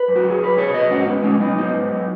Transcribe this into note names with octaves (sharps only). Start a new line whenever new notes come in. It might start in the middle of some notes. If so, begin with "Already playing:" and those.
Already playing: B4
F#2
F#4
F#3
G#4
F#3 B4
B2 G#4 C#5
F#3 B4 D#5
G#2 C#4 F#4
D#3 B3 D#4
B2 G#3 C#4
F#3 B3 D#4
G#2 B3 D#4
G#2
F#3